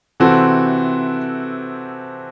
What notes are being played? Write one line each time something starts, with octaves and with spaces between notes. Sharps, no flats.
C3 E3 C4 F#4 A4